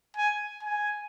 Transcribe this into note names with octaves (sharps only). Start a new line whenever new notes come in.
G#5
G#5